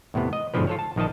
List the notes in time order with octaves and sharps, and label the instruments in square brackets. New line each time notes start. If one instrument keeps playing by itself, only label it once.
[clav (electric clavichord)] E2 A2 C3 B3
D#5
G1 G#2 B2 D3 F3 B4
F4 A4 C#5
A5
A#1 D#3 F3 D#5 A5